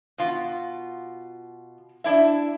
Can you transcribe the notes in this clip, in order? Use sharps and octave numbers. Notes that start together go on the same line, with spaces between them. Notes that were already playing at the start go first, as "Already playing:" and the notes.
B2 F4
D4 E4 E5